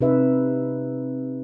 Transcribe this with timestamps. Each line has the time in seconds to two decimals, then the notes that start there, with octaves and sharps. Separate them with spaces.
0.01 C3 D#4 B4 E5